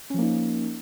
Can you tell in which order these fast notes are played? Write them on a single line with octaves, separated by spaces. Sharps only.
C#4 F3 A#3 D#4